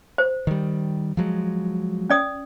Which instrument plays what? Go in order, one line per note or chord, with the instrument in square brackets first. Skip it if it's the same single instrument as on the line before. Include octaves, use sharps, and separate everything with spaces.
[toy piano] C5
[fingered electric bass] D#3 G3
F3 F#3 G#3
[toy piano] C#4 D5 D#6